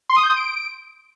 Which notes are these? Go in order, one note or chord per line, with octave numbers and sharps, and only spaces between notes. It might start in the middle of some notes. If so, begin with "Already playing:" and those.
C6
D#6
G6
D#6
D7